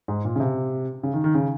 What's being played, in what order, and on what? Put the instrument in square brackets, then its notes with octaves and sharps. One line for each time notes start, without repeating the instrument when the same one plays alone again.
[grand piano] G#2
A#2
C#3
C3
C#3
D#3
D#3
C#3